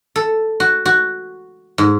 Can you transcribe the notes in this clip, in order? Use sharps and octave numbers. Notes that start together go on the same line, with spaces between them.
A4
F#4
F#4
G#2